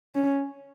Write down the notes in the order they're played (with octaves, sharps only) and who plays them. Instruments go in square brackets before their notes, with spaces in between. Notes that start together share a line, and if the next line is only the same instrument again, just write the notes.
[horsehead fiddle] C#4